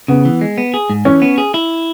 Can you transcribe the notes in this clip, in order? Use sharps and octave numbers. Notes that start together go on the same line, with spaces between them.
C#3 B3
E3
G#3
B3
G#4
G#2
E3 C#4
B3
G#4
E4